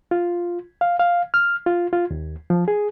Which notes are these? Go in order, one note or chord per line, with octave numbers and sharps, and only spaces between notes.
F4
F5
F5
F6
F4
F4
D#2
F3
G#4